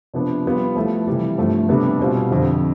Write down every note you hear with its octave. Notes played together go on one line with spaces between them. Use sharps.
C3 F3 B3 D4
G3 B3 F4
F3 A3 E4 A4
C3 E3 G3
G2 F3 A3
C3 G3 B3 D4 A4
B2 G3 C4 F4
F2 D3 F3